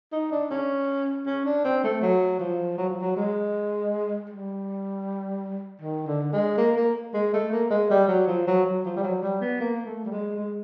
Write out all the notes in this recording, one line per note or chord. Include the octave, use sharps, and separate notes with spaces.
D#4
D4
C#4
C#4
D4
C4
A3
F#3
F3
F#3
F3
F#3
G#3
G3
D#3
D3
G#3
A#3
A#3
G#3
A3
A#3
G#3
G3
F#3
F3
F#3
F#3
F3
G3
F#3
G3
B3
A#3
A3
G3
G#3
G#3